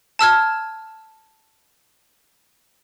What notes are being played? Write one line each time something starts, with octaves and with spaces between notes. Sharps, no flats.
A5 E6 F6 G#6